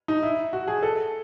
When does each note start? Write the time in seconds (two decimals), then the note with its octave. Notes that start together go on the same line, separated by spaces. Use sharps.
0.08 D#4
0.22 E4
0.53 F#4
0.67 G#4
0.83 A4